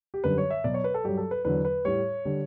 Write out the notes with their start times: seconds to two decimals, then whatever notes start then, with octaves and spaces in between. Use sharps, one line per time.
0.14 G4
0.24 F#2 D3 G3 B4
0.38 C#5
0.50 E5
0.64 B2 F#3 D5
0.74 C#5
0.84 B4
0.94 A4
1.04 G2 F#3 G4
1.17 A4
1.31 B4
1.45 E2 D3 F#3 B4
1.65 B4
1.85 A2 G3 C#5
2.25 D3 G3